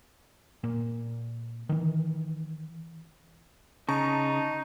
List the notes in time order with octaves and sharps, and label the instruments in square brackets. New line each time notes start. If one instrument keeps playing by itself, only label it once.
[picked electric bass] A#2
D#3 E3
[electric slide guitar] C#3 [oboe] D#4 [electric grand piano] A5 A#5 C#6